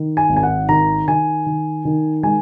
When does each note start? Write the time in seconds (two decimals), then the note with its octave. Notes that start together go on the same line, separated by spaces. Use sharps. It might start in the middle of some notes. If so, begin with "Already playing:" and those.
Already playing: D#3
0.17 G#5
0.29 G#1
0.37 G#5
0.43 F#5
0.69 D#3 A#5
1.08 D#3 G#5
1.46 D#3
1.85 D#3
2.23 G#3 G#5